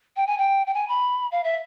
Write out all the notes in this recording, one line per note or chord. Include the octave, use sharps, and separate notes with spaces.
G5
G#5
G5
G5
G#5
B5
F5
E5